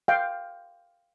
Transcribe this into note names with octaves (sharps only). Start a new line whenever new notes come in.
F5 G5